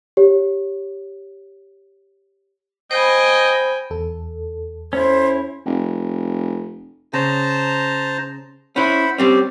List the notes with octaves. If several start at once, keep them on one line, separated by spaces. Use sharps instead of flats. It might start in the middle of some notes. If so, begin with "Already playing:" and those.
G4 C#5
C5 D#5 G5 G#5 B5
E2 A4
C#4 E4 C5
F1
C#3 C5 A5 A#5
C#4 E4 C5 F#5 B5
G3 C4 C#4 G4